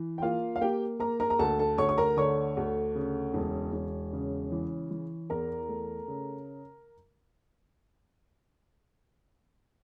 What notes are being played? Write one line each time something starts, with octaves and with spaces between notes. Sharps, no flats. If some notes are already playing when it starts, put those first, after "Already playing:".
Already playing: E3
G5
A#3 F4 F5
F5
A#3 G4 G5
A#3 A#4 A#5
A#4 A#5
A#5
D2 A4 A5
A4 A5
D2 C#5 C#6
C#6
A#4 A#5
D3 C#5 C#6
D2
C#3
E1
E1
C#3
E3
E3
E2 A#4 A#5
A3
C#3